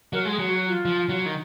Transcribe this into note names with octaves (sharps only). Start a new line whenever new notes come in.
F#3 A#4
G#3
G#4
F#3
F#4
F4
F3
F#3
D#3